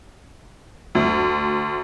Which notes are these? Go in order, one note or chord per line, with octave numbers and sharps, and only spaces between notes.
D2